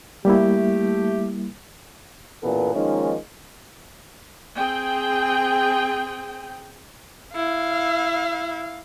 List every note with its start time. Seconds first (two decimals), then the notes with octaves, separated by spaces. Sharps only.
0.25 G3 A3 A#3 E4 G4
2.43 A1 E2 A#2 B3 A4 B4
2.74 D#3 F3 G#3 A#3 C#4 D#4
4.56 C4 G#4 G5
7.35 E4 F5